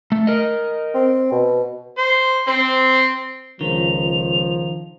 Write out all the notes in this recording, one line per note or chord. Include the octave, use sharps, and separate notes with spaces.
A3
A#4 D#5
C4
B2
C5
C4 C5
C#2 D#3 F3 F7